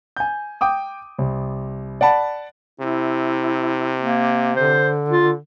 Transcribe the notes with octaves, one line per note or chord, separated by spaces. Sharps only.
G#5 G6
G5 D6 D#6
C2
D5 F#5 A5 B5
C3 E4
A#3
D3 C5
F4